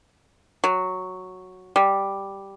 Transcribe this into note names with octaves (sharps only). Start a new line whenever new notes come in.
F#3
G3